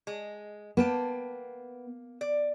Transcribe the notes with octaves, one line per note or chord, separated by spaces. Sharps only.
G#3
A#3 B3 G5 A5
D5